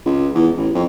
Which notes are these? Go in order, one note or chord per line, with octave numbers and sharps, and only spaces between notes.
C#2
E2
A1
F2